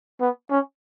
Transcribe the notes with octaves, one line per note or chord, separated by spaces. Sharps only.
B3
C#4